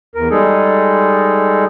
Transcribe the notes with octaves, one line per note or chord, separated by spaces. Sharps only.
E2 A#4
G3 G#3 D#4 G#4 A4